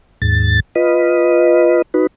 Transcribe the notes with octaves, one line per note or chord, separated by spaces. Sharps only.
D#2 G#2 A6
F4 B4 D#5
D#4 F#4 B4